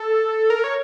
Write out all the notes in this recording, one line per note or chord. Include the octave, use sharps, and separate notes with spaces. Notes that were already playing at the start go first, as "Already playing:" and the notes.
Already playing: A4
A#4
C#5